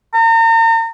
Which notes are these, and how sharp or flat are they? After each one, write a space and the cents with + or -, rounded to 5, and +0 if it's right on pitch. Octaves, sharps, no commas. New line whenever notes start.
A#5 -40